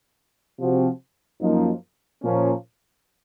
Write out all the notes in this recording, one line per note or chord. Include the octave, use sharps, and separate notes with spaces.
C3 F3 C4 F#4
F#2 F3 A#3 D#4
A#2 F3 A#3 C#4